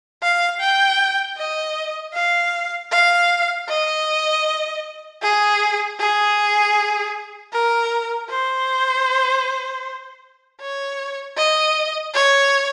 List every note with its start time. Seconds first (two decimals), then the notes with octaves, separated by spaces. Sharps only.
0.22 F5
0.60 G5
1.37 D#5
2.14 F5
2.91 F5
3.68 D#5
5.22 G#4
6.00 G#4
7.53 A#4
8.29 C5
10.61 C#5
11.37 D#5
12.14 C#5